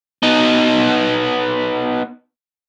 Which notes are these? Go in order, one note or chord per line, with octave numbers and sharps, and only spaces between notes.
B3 D#4